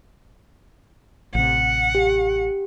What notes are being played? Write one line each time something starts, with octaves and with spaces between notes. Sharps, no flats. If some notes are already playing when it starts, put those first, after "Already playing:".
A1 C3 F#5
G4